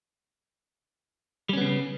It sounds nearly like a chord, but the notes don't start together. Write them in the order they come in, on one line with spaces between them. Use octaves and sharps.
G3 C#4 B3 C#3